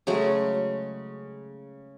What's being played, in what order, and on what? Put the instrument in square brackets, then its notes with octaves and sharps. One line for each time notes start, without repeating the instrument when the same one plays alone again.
[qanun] C#3 F#3 G#3 A3